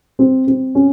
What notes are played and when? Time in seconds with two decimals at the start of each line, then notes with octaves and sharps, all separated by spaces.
0.19 C4
0.47 C4
0.75 C#4